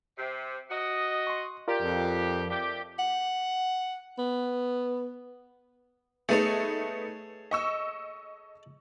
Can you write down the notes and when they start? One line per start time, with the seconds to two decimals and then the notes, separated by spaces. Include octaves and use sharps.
0.17 C3
0.69 F#4 D#5
1.27 C6 C#6
1.68 F4 G4 A#4 D5
1.82 F2
2.50 A3 D4 G4
2.99 F#5
4.19 B3
6.29 A3 B3 D#4 G#4 A4 C#5
7.51 D#5 C#6 E6